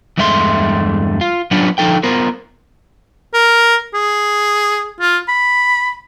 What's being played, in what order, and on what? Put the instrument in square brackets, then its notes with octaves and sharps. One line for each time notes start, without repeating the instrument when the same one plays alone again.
[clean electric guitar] E2 G2 G#3 A3 E5 C6
F4
F#3 G3 B3 C#4 D4 F4
D3 F3 D#4 A4 G5
B3 F4 A#4 C5
[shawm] A#4
G#4
F4
B5